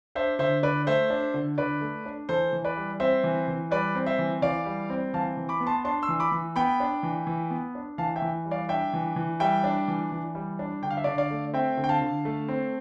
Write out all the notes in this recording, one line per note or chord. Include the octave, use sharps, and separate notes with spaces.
D4 C5 E5
D3 C5 E5
D3 B4 D5
A3 C5 E5
D4
D3
D3 B4 D5
A3
D4
E3 A4 C5
E3
B4 D5
G3
C4 C5 E5
E3
E3
G3 B4 D5
C4
C5 E5
E3
E3 D5 F5
G3
C4
E3 F5 A5
E3
B5 D6
B3
A5 C6
D4 A5 C6
C6 E6
E3
B5 D6
E3
B3 G5 B5
D4
E3
E3
B3
D4
E3 F5 A5
E5 G5
E3
G3
D5 F5
D4 E5 G5
E3
E3
G3 E5 G5
D4
E3
E3
G3
D4
D3 G5
F5
E5
D3 D5 F5
D5 F5
A3
C4 E5 G5
D3
G5
F5 A5
D3
A3
C4